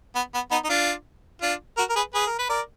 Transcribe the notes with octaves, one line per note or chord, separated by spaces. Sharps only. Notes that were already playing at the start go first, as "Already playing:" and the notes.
B3
B3
B3 D#4
D#4
D4 F4
D4 F4
F#4 A#4
A#4
G#4 B4
G#4 B4
A#4
B4
A#4 D5